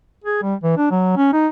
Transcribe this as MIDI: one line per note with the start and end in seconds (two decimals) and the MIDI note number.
0.24 0.41 68
0.42 0.55 55
0.63 0.73 52
0.77 0.89 62
0.91 1.13 54
1.17 1.32 61
1.33 1.48 63